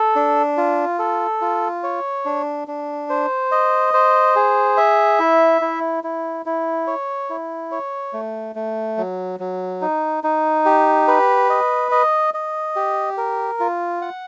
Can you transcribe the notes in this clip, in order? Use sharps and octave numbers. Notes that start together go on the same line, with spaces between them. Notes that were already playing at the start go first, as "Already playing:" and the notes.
Already playing: A4
D4
F4
A4
F4
C#5
D4
D4
C5
D#5
C5
G#4
E5
E4
E4
E4
E4
C#5
E4
C#5
A3
A3
F#3
F#3
D#4
D#4
G4
B4
D#5
D#5
D#5
G4
A#4
F4
F#5